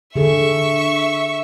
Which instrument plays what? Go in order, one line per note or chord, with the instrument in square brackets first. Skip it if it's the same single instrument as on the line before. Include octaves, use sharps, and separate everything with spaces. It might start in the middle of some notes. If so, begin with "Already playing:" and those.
[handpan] D3 G#4 A4 [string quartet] E5 C#6